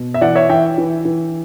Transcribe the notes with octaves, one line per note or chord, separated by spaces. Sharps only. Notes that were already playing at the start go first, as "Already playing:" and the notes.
Already playing: B2
E5
E3 D5 F#5
C#5 E5
E3 E5 G5
E3
E3